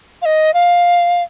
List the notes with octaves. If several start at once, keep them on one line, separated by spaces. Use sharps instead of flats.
F5
D#5
F5